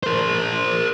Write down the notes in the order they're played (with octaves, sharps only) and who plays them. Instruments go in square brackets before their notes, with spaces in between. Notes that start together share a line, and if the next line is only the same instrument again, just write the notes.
[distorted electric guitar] A#4 C5